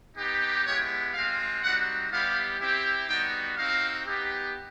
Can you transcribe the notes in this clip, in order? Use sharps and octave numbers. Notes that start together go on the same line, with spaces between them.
B3 D#4 G4
G#3 B3 E4 G4 C#5
G#3 C4 F4 F5
G3 C4 D#4 F#4 F#5
G3 B3 E4 G4 F5
C4 E4 G4
G3 B3 D#4 F#4 G5
C4 D#4 F#4 F5
B3 D#4 G4